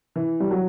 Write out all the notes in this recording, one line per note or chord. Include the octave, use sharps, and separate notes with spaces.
E3
G3
F#3